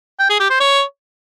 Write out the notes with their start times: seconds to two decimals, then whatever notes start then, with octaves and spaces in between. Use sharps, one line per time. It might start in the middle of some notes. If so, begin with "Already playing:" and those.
0.19 G5
0.29 G#4
0.40 G4
0.50 C5
0.60 C#5